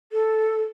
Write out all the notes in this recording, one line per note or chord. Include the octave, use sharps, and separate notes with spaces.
A4